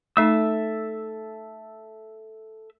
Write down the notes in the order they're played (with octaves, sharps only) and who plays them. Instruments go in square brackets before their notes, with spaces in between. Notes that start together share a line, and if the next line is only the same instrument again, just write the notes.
[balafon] A3 D#4 [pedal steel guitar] A4 E5 E6